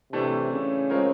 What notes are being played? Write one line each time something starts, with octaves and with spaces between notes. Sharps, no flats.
A2 C3 E3 A3 D4
C#3
G#3 C4 F4 A#4 C#5